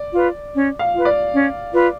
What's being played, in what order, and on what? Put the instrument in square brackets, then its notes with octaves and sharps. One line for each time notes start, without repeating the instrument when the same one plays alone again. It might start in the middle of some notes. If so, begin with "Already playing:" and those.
Already playing: [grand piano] D5
[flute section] F4 B4
C#4
[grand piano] F5
[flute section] F4 B4
[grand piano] D5
[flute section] C#4
F4 B4